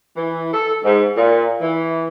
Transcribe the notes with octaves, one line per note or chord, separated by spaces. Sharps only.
E3
A4
G#2
A#2
E3